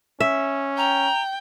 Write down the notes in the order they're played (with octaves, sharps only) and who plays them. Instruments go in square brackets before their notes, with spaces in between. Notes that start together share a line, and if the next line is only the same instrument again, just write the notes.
[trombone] C#4 [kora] E5
[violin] G5 [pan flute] A#5